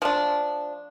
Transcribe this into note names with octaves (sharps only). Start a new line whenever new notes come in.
F3 A3 D4